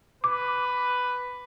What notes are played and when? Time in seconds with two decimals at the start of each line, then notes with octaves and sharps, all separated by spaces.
0.24 B4 D6